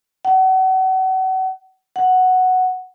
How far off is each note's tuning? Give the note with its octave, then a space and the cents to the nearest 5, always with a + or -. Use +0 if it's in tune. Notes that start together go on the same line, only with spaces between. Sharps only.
F#5 +35
F#5 +0